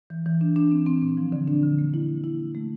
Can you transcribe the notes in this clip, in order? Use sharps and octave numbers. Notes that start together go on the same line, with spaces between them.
E3
E3
D4
D4
C4
C4
A#2
F3
D3
D4
D3
A#3
E4
E4
E4
E4
A3